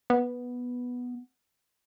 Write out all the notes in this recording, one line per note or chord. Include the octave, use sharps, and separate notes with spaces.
B3